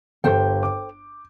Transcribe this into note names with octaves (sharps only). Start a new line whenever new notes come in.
G1 G4 A4 C5 G5 G6
D6